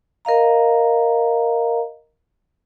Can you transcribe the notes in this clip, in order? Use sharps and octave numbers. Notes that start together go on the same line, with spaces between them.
A#4 D#5 F5 A#5